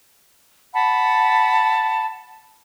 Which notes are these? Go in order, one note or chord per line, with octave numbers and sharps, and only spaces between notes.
F#5 A5 B5